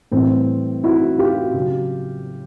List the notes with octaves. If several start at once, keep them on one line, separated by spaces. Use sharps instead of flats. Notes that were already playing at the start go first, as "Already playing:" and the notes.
A2 E3 G3 C4
E4 F#4
F4 G4
C#3 F#3